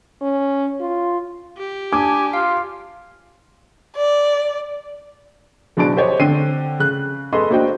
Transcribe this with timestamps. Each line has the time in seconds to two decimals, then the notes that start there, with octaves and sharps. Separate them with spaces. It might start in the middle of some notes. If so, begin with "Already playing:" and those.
0.21 C#4
0.81 F4
1.58 G4
1.93 D4 G#5 D6
2.33 F4 F5 F6
3.96 D5
5.77 F#1 B2 D4 G#4 A5 D7
5.96 G4 C5 C#5 D#5
6.20 D3 C4 G5 C7 D#7
6.79 C#3 F#6
7.33 G#4 A4 B4 D#5 C6
7.51 A#3 D4 F#4 C5 D#5 G5